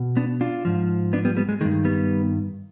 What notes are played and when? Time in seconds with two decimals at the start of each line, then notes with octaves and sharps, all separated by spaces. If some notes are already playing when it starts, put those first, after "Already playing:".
Already playing: B2
0.17 B3 D4
0.41 D4 F4
0.65 G#2 F3
1.13 B3 D4
1.25 G3 B3
1.37 G3 B3
1.49 G#3
1.61 D#3 G#3
1.65 G2
1.85 G3 B3